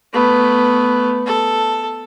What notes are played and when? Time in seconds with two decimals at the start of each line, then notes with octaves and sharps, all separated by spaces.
0.13 A3 B3
1.26 A4